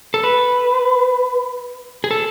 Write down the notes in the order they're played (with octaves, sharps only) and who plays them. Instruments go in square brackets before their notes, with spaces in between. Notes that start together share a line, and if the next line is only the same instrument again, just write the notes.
[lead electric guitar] A4
B4
G#4
A4